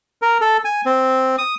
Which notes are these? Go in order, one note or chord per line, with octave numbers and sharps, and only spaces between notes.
A#4
A4
G#5
C4
D#6